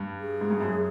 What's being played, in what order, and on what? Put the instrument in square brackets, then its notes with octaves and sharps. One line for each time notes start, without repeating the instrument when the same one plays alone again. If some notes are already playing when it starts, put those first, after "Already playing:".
Already playing: [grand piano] G2
[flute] G#4
[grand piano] G#2
G2
F#2